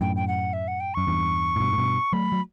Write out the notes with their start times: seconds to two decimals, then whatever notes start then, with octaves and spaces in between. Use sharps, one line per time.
0.01 F#2 A2 G5
0.16 G5
0.28 F#5
0.53 E5
0.68 F#5
0.80 G5
0.94 F#2 C#6
1.07 E2 G2
1.56 A2
1.60 G2 B2
1.73 A2
1.78 G2 B2
2.13 F#3 A3 B5
2.32 F#3